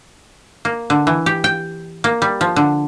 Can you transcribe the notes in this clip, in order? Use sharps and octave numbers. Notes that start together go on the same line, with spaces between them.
A#3
D3
E3
G4
G5
A#3
G3
F3
D3